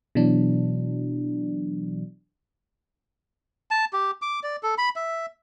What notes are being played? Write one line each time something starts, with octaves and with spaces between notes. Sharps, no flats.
B2 E3 F#3 D4
A5
G4
D6
D5
A4
B5
E5